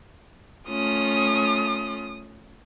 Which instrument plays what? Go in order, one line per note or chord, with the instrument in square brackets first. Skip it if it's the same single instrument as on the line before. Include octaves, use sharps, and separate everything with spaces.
[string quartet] A3 C#4 F4 [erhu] D#6